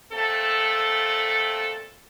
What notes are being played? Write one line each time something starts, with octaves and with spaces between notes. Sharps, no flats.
A#2 A3 C4 A4